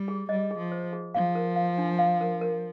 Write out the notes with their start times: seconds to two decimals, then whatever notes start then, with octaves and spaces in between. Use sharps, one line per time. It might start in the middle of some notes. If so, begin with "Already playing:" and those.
Already playing: G3
0.08 G#4
0.29 G3 D#5
0.51 G#4
0.57 F3
0.72 C5
0.93 G#4
1.14 F3 F5
1.35 A#4
1.56 F5
1.78 D4
1.99 F5
2.21 A#4
2.41 A#4